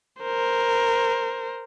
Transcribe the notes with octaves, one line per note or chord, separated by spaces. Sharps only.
A#4 C5